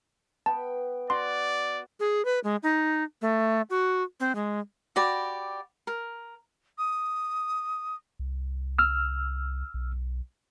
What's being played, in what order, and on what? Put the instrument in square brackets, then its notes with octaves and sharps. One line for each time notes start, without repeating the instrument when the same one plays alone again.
[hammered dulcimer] B3 G5 B5 [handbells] A5
[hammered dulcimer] F#4 [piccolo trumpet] D5 [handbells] C6
[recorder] G#4
B4
G#3
D#4
A3
F#4
C4
G#3
[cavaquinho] F#4 G4 D5 B5
A#4
[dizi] D#6
[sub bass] C2
[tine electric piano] E6 F6
[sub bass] B1